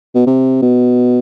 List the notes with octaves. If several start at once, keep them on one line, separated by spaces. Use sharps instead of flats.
B2
C3
B2